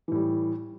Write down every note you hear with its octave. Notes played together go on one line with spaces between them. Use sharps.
A2 E3 G3